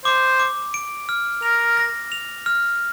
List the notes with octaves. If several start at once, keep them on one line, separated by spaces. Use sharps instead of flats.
C5 D6
D6
D7
F6
A#4 F7
A#6
F7
F6